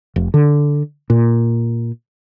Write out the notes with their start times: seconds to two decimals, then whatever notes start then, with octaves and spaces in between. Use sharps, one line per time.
0.16 F1
0.34 D3
1.10 A#2